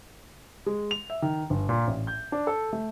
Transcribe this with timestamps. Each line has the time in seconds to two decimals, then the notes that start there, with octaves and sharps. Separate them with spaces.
0.66 G#3
0.91 F7
1.10 E5
1.22 D#3
1.50 G1
1.69 A#2
1.87 A1
2.07 G6
2.32 D4
2.47 A4
2.73 A3